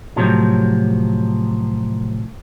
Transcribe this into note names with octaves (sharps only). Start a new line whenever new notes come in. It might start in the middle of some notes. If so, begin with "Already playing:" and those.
A2 C3 F3 F#3